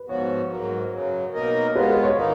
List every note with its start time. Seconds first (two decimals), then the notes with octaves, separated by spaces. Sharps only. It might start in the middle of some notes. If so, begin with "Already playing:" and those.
Already playing: B4
0.08 G#2 F3 B3 F#4 C#5
0.50 G#2 F#3 A#3
0.93 F#2 C#3 F#3
1.34 B2 A#3 D#4 A#4 D#5
1.75 G#3 B3 F4 B4
1.90 B4
2.04 C#5
2.17 D#3 A#3 D#4 C#5